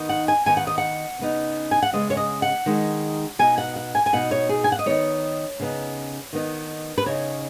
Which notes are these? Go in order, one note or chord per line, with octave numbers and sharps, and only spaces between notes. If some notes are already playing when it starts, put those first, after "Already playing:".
Already playing: D#3 B3 D#4
F#5
G#5
D#3 B3 D#4 G#5
F#5
D#5
F#5
C#3 B3 D#4
G#5
F#5
C#3 G#3 B3 D#5
C#5
D#5
F#5
D#3 G#3 D#4
B2 B3 D#4 G#5
F#5
F#5
G#5
G#5
B2 B3 D#4 F#5
C#5
G#4
G#5
F#5
D#5
D#3 B3 D#4 C#5
C#3 B3 D#4
D#3 B3 D#4
B4
C#3 B3 D#4 C#5